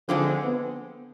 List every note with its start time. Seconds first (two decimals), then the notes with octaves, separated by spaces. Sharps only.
0.09 D3 F3 G#3 C4 E4 G#4
0.42 B3